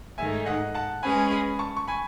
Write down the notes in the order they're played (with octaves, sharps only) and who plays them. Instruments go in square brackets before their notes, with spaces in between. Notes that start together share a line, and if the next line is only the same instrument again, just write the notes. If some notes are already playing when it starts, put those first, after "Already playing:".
[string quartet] G#2 D#3 A3 D#4 G#4 [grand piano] E5 G#5
[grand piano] D#5 F#5
F#5 A5
[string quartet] G#3 C#4 G#4 B4 [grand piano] G#5 B5
[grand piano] G#5 B5
A5 C#6
C#6
G#5 B5